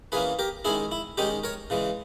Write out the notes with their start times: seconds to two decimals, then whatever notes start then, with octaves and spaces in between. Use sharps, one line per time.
0.12 E3 A#3 C#4 G#4 B4
0.39 G4 A#4
0.65 D#3 G#3 C#4 E4 G#4
0.92 E4
1.18 D#3 G#3 C#4 D#4 G4
1.44 A#4 C#5
1.70 C#3 E3 G#3